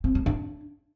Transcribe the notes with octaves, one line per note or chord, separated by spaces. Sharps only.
C4
A3
D4